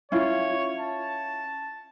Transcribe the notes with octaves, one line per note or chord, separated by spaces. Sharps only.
C#4 E4 F4 C#5
A5